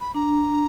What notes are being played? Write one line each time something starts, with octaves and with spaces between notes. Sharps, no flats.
B5
D4 A#5